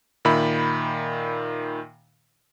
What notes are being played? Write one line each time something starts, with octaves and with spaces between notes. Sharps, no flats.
A#2 D#3 E5 B5